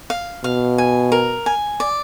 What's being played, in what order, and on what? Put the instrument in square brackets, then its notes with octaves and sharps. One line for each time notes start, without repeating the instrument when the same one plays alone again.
[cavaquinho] F5
[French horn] B2 [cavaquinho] F5
[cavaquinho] G#5
A#4
G#5
D5